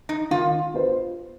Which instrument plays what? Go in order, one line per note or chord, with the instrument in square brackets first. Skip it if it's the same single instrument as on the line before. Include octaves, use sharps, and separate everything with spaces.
[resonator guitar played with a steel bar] D#4
[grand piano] D#3 [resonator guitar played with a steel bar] F4
[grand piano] B3 F4 C5